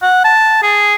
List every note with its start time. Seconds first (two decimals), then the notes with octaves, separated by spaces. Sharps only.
0.02 F#5
0.24 A5
0.63 G#4